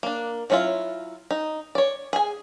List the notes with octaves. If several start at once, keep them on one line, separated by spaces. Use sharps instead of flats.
A#3 D4
F#3 C#4 D4 E4 F4
D#4
C#5 D5
G#4 G#5